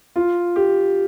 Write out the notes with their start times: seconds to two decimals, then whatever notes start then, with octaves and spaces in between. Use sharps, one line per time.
0.16 F4
0.56 G4